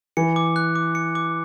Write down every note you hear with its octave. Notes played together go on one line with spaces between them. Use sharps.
E3 C#7
D6
F#6
D6
C#7
D6